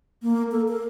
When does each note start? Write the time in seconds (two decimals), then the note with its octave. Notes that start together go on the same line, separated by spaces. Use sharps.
0.22 A#3
0.52 A4
0.68 A#4